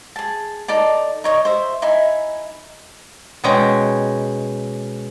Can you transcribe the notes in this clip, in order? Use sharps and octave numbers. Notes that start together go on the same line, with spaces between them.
G#4 A5
D#4 A4 D5 A5
D#4 C#5 D#5
C5 E5
D#4 E4 E5 G#5
B2 G#3 C#4 G5 A#5